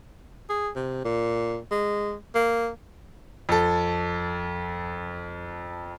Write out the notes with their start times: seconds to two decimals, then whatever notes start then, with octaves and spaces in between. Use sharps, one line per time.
0.49 G#4
0.76 C3
1.05 A#2
1.71 G#3
2.35 A#3
3.49 F2 A4